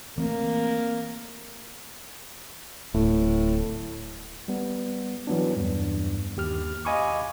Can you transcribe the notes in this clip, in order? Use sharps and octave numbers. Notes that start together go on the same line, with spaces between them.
E3 A3 A#3 C4
D1 A2
G3 B3
E3 F#3 B3 D4
E2 G2
D#2 G4 F6
D#5 F5 G#5 B5 C#6 D6